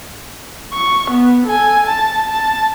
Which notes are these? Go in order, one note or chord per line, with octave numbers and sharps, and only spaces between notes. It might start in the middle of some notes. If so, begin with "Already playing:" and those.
C#6
B3
A4 G#5
A5
A5